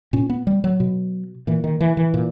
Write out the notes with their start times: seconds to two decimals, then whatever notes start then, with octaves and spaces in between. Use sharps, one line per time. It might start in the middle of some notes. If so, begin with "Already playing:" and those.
0.13 A#2 C#4
0.30 B3
0.47 G3
0.64 F#3
0.80 B2
1.47 A#2 E3
1.64 D#3
1.80 E3
1.97 E3
2.14 A#2